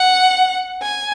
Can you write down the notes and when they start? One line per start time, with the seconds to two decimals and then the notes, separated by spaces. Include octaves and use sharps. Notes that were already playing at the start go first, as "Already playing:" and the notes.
Already playing: F#5
0.82 G#5